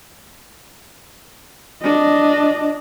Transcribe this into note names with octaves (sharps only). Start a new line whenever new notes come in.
D4 D#5